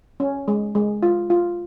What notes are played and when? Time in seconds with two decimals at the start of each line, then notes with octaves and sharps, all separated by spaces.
0.20 C#4
0.48 G#3
0.75 G#3
1.03 F4
1.30 F4